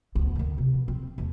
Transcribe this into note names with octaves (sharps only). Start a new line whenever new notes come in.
D2 B3
D3 D#3
C3
B2
C4
E2 A3